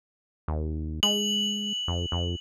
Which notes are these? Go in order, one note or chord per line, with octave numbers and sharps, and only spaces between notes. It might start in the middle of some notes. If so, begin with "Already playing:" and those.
D#2
G#3 F#7
F2
F2